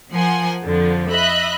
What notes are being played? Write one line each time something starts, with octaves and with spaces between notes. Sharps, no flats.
F3 A#4 F#5 G#5 C6
F2 D3 F3
D#5 E5 B5 F#6